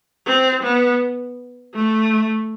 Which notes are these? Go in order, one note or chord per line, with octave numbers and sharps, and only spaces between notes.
C4
B3
A3